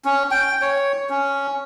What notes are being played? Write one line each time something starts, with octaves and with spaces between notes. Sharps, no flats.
C#4
G5
C#5
C#4